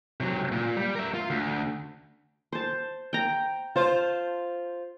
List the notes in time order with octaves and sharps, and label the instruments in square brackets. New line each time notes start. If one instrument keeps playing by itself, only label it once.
[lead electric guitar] C3 F#3
A#2
G3
A#4 E5
F4
D2
[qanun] C5 A5
G5 A#5
[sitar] F4 C5 [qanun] A5